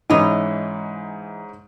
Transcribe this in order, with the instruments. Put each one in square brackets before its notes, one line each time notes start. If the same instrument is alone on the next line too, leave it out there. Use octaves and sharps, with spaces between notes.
[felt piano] G#2 C#4 D#4 [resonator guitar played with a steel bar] E3 D#5